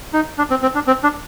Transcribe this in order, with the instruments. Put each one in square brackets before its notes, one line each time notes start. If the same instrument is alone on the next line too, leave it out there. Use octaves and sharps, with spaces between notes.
[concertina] D#4
D4
C4
C4
D4
C4
D4